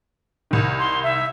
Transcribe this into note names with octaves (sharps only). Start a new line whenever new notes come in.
C2 D#3
C6
E5